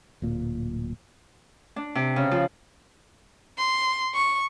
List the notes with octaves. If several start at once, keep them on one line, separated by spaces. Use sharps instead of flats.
D1 A#2
D4
C3
C#3
F3
C6
C#6